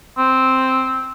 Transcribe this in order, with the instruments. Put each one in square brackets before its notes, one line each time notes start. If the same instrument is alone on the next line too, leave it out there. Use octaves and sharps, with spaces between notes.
[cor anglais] C4